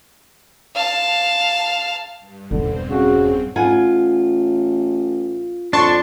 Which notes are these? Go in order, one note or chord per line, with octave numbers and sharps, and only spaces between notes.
F5 A5
G2
E1 G2 D3 C4
C#3 F#4
A1 F4 F#5 G#5
F2 D4 A5 C6 C#6